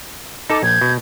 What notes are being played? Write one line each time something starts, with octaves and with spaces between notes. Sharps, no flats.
D#4 A4 A5 D6
A#1 G6 G#6
B2